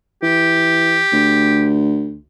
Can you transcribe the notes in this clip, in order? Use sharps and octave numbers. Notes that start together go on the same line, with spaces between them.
E3 G4
D2